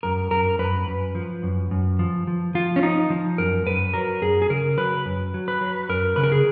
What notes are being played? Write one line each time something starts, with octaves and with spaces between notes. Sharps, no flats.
F#2 A#4
F#2 A#4
F#2 B4
F#2
F3
F#2
F#2
F3
F3
F3 F4
C#4
F3 D#4
F3
F#2 A#4
F#2 B4
F#3 A#4
F#2 G#4
G#4
C#3 A#4
F#3 B4
F#2
F#3
B4
F#3
F#2 A#4
C#3 B4
A#4
G#4